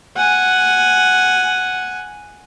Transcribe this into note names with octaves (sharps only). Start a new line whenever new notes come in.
F#5 G#5